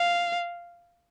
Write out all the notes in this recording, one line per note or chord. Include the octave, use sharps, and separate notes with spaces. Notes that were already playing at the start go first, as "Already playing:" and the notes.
Already playing: F5